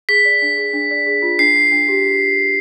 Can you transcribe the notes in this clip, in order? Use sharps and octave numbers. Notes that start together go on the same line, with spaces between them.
G#4 B6
D5
D4
G#4
D4
D5
G#4
F4
D4 C7
D4
D4
G4